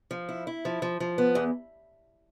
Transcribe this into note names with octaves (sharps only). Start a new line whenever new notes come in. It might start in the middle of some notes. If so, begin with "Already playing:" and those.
F3
E4
E4
F3
F3
F3
B3
E2